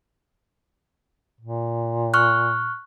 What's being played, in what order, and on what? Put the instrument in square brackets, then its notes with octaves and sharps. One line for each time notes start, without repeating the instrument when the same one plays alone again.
[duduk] A#2
[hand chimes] C#6 F6 F#6